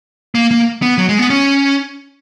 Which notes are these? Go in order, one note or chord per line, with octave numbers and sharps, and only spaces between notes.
A#3
A#3
B3
F#3
G#3
B3
C#4